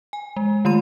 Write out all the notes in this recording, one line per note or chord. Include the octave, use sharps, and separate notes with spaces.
G#5
G#3
D#3 A3 F4 C6 D#7